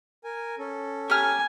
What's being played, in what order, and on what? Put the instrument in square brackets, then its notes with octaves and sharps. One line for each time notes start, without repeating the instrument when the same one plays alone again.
[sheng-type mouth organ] A#4 G#5
C#4 A4
[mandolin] G4 A#5 F6 [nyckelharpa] G#5